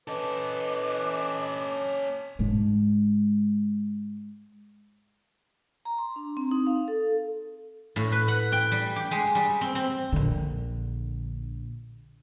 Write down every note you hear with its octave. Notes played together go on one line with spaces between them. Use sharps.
C#4 A4 B4 D#5 D6
G#2 G#3
A#5
C6
D4
C4
D#4
F5
A4
A2
B4
F#5
G5
G3
G4
G#3
G3
C4
C4
A#1 D3